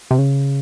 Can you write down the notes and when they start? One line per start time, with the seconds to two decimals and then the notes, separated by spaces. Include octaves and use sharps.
0.11 C3
0.19 C#3